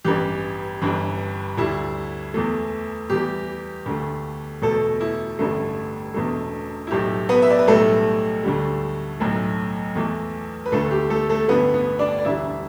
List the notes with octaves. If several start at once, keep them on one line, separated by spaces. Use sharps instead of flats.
A1 G2 E3 G4
G1 G2 E3
D2 D3 G3 E4
E2 E3 A3
E2 E3 G3 G4
D2 D3 A3
E2 B2 A3 A4
E4
A1 G2 D3 A3
E1 E2 B2 A3
E4
B1 A2 A3 G4
B3 B4
E5
D5
B4
B1 A2 G3 A3 A4
D2 D3 G3
B1 A2 A3
E2 E3 A3
B4
D2 D3 A3 A4
G4
A3 A4
A3 A4
A1 G2 D3 A3 B3 B4
B3 B4
D4 D5
D5
E1 D2 D3 G3 E4 E5